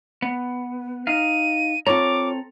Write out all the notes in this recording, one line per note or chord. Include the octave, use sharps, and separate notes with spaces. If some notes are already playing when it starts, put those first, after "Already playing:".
B3
D#4 F5 D#7
C4 F4 A4 C#5 A#5 D6